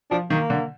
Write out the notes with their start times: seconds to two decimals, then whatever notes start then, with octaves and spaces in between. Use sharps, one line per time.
0.11 F3 D4
0.30 D#3 A#3
0.50 D3